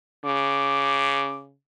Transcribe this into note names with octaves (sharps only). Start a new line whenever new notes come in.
C#3 D6